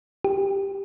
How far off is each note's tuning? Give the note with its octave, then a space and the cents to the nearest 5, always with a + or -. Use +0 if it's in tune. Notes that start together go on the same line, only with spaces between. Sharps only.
G4 +5